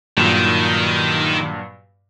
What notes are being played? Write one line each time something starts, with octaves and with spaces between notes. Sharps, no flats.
G2 A#2 D#3 F#3